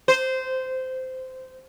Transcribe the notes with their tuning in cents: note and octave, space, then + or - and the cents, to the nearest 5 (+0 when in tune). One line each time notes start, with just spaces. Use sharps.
C5 -15